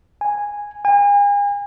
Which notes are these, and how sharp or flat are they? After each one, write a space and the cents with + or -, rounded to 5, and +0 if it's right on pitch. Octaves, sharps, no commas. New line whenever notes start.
G#5 -10
G#5 -40